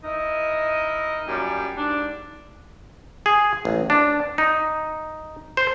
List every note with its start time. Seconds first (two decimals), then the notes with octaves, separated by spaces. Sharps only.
0.02 D#4 E4 A#4 D#5
1.26 F#2 A#2 G3 C#4
1.76 G#2 G3 D4
3.26 G#4
3.65 A1
3.90 D4
4.38 D#4
5.57 C5